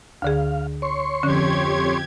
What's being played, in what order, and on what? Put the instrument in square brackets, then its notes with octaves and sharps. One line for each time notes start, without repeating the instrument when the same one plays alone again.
[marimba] D2 D3 G#4 [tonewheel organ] F5
[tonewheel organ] C#5 C6 C#6
[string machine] F2 G4 G#6 [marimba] D3 C#4